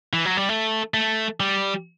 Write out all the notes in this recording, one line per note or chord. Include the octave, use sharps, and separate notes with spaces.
E3
F#3
G3
A3
A3
G3